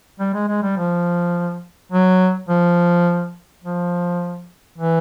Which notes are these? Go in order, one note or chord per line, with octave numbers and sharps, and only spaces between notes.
G3
G#3
G#3
G3
F3
F#3
F3
F3
E3